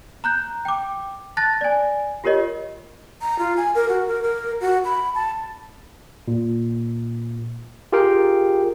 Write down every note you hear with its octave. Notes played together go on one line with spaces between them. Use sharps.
A#5 F#6 G6
G5 D6
A5 F#6 A6 A#6
D5 G#5
F4 G4 A#4 C#5 D#5
A#5
F4
G#5
A#4
F#4
A#4
A#4
F#4
B5
A5
A#2
F4 G4 G#4 A#4 F5 G5